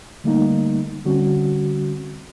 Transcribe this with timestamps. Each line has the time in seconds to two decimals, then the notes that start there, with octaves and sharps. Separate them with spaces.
0.24 D3 G3 A3 A#3 D#4
1.05 D3 G3 C4 C#4 F#4